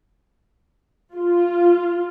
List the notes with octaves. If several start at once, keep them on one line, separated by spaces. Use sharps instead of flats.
F4